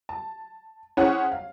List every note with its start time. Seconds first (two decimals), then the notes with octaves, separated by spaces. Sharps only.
0.09 A5
0.97 C#4 E4 G#4 C5 C#5 F#5
1.32 F5